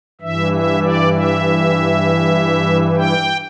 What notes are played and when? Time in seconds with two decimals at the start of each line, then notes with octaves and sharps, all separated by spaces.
0.21 G2 E3 E5
0.52 E5
0.82 D5
1.13 E5
2.96 G5